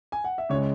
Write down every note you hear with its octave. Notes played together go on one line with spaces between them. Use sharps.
G#5
F#5
E5
C#2 C#3 G#3 C#5